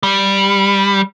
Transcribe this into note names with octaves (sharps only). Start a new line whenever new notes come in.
G3